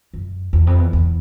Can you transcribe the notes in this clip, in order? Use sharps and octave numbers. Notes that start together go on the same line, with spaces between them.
F#2
E2
F2
E2
E2